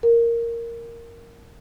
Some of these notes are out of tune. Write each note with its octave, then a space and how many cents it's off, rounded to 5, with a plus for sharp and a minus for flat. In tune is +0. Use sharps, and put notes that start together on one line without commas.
A#4 -5